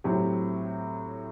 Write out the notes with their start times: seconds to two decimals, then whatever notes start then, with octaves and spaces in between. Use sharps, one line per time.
0.04 A2 F#3 C4 G4